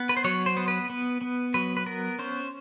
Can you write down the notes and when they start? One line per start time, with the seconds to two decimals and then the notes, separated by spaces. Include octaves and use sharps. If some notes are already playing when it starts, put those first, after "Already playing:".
Already playing: B3
0.09 B4
0.17 C5
0.24 F#3 C#5
0.46 C5
0.57 B3
0.68 B4
0.90 B3
1.21 B3
1.54 F#3 B4
1.77 B4
1.86 B3 A#4
2.19 C#4 C5